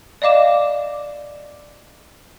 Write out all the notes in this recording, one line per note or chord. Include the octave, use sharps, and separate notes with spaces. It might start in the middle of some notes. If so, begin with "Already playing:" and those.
D5 D#5 F5 D6 E7